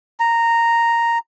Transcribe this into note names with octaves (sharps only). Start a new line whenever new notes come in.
A#5